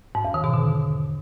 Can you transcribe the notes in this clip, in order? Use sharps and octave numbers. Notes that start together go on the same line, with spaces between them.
G#2
E2
D#3
B2
D3